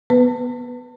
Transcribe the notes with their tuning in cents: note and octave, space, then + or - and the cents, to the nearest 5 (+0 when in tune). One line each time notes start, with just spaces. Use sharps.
B3 +0 B4 +10